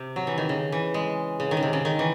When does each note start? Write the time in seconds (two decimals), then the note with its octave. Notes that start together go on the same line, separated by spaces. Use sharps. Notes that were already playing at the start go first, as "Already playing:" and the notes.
Already playing: C3
0.16 F#3
0.27 E3
0.38 D#3
0.49 C#3
0.72 E3
0.94 G#3
1.40 C#3
1.51 D#3
1.57 C#3
1.63 C3
1.73 C#3
1.85 D#3
1.99 E3